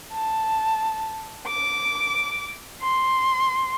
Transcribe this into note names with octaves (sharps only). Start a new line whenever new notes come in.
A5
D6
C6